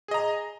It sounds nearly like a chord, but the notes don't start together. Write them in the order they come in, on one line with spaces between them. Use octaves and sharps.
G#4 D#5 A#5